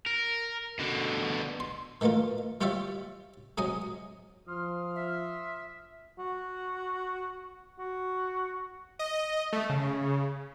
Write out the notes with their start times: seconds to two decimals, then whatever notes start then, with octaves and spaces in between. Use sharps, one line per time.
0.07 A#4
0.79 B2 D3
1.60 C6
2.01 D#3 E3 A3 A#3 F4
2.61 G3 F4 G4 C#5 D5 E5
3.58 C3 F#3 G#3 D#5 G#5 D#6
4.48 F3 C6 D#6 F6
4.95 E5
6.19 F#4
7.79 F#4
8.99 D#5
9.53 A3
9.70 C#3